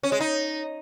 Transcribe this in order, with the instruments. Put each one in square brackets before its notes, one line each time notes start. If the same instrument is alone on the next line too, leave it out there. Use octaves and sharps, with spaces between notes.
[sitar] C#4
G#3
D#4